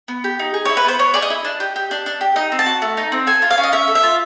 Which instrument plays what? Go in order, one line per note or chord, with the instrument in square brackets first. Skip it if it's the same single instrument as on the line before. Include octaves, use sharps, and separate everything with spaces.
[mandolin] B3
G4
D#4
G#4
E4 C#5
B4
B3 C5
B3 C#5
G#4 D5
D#5
E4
D4
G4
G4
D4
D4
G4
D#4 D#5
C4
A5
F#4
A3
D#4
C4
A4 G#5
F4
F5
C#4
D#5
C#4 E5
A4
E5
F4